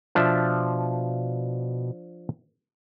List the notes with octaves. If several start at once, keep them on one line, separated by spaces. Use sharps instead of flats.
B2 F3 D4 E5